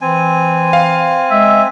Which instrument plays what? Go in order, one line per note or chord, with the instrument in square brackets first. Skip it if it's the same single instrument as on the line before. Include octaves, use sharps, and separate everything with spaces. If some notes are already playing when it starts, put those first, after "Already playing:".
[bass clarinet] E3 [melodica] C4 G#5
[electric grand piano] F5
[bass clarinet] G#3 [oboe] E5